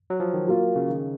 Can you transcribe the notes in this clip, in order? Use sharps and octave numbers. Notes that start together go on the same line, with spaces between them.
F#3
F3
D#3
F#3 A#3 F4
C#3
D#3